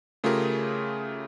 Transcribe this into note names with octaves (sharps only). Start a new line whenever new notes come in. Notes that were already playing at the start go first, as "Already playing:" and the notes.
C#3 A3 F4 G4 G#4 A#4